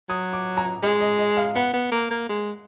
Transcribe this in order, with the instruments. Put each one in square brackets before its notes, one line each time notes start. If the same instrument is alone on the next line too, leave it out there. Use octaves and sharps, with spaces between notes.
[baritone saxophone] F#3 [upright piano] D#6
[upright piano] D6
A#5
[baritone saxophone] G#3 [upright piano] D#5
[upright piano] D#5
D#5
F5
[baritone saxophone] B3 [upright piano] F#5
[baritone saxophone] B3
A#3
A#3
G#3